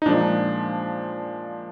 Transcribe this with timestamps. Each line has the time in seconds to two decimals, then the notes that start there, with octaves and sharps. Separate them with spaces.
0.02 D#4
0.06 A#2 F3 G#3 D4